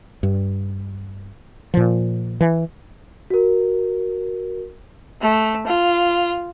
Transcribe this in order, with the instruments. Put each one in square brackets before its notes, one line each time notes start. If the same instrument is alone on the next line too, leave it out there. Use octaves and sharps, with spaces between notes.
[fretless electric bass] G2
A#2 F3
E3
[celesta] F#4 A#4
[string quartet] A3
F4